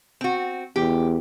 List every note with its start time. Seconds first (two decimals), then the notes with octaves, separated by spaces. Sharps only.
0.21 C4 F#4
0.76 E2 G4